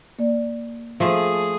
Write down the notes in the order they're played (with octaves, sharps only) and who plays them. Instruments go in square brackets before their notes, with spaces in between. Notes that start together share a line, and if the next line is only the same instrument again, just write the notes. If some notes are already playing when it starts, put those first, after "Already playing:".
[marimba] A#3 D5
[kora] F3 A3 [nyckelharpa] G#4